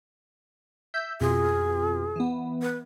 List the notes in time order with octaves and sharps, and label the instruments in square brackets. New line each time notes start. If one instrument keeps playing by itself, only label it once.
[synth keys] E5 E6 G6
[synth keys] F2 B2 F4 [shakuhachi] G#4
[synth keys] E3 B3
[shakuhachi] B4